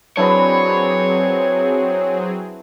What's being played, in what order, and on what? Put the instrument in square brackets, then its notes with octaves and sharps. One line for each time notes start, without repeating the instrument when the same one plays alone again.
[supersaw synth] F#3 C4 G#4 [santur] D4 E4 B4 [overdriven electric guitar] C#5